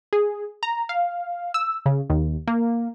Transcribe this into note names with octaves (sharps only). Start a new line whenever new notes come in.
G#4
A#5
F5
E6
C#3
D#2
A#3